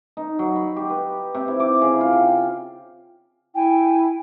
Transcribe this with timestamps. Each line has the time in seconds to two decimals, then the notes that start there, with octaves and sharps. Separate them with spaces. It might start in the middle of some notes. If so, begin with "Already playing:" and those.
0.17 D#4
0.39 F#3
0.56 B5
0.76 G4
0.90 B4
1.34 C3
1.48 E4
1.60 D6
1.82 C#3
2.01 F4
2.13 G5
3.55 E4 G5 G#5